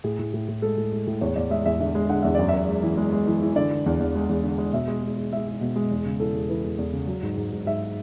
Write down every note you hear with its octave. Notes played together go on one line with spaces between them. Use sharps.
A2 G#4
A2
A2
A2
G#3 A4
A2
G#3
A2
E2 C#5
E2 D5
G#3 E5
E2 E5
D3 E5
G#3
D3 F#5
E2 E5
F#2 D5
E5
F#2
G#3
E3
G#3
G#3
E3
E3
D3 D5
D3
E2
E2
G#3
E2
D3
G#3
B2 E5
G#3
G#3
G#3
G#3 E5
G#3
B2
G#3
E2
C#3
E3 A4
E2
E3 B4
E2
E2
C#3
F#3
G#2
G#2
G#2
G#2 E5